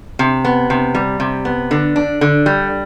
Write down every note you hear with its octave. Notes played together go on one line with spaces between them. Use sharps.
C3
B3
C3
G3
C3
B3
D3
D4
D3
G3